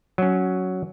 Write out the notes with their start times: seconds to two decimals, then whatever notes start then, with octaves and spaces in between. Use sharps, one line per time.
0.18 F#3 C#4